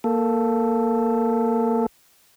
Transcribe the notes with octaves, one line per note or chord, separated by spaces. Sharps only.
A#3 A4